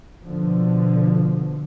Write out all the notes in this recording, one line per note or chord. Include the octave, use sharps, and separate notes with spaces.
B2 D3 F3